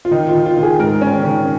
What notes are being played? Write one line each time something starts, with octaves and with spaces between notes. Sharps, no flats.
F4
D#3 D#4
F4
D#3
F4
D#3
G#4
G#2 A#4
D#3 C#4
D#3 C#4